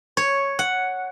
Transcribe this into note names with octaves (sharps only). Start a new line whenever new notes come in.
C#5
F#5